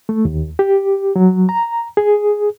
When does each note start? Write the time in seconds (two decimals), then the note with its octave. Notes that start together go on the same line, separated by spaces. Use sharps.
0.09 A3
0.25 D#2
0.59 G4
1.16 F#3
1.49 A#5
1.97 G#4